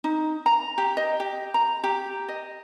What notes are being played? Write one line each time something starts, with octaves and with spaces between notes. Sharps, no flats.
D#4
A#5
G4
D#5
G4
A#5
G4
D#5